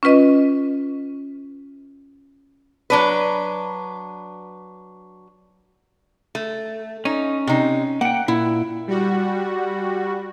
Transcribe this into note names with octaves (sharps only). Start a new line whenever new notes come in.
C#4 F4 B4 D#5
F#3 D4 B4
A3
C#4 D#4
C3 D#4
A#3 F#5 G5
A#2 E4
G3 F#4